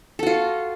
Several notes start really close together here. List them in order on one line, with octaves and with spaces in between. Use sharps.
A4 F#4 F4